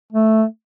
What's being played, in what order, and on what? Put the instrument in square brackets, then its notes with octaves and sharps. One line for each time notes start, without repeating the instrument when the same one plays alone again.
[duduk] A3